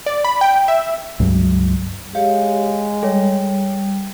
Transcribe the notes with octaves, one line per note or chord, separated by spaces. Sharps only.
D5
B5
G5
E5
C#2 G2 F#3
G#3 G4 C#5 F5
G3 A4 C#5